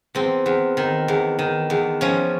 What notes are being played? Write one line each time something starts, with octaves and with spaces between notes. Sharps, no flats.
E2 C4
E2
D#3
E2
D#3
E2
F3 C#4